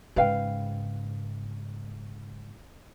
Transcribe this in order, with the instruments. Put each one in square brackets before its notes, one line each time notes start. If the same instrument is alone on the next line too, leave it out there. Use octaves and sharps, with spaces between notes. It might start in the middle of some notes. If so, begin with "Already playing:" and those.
[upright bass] G#2 C#3 [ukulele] B4 F5 G5